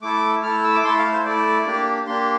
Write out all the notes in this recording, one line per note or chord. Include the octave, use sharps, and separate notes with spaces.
A3 E4 A4 D6
A3 E4 A4 F6
E6
D6
A3 E4 A4 C6
F5
C5
A3 E4 A4 D5
A#3 D4 G4
A#3 D4 G4 C6